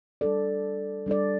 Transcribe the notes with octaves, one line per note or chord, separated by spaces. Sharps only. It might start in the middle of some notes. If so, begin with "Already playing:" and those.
G3 D4 A4 D5
G3 D4 A4 D5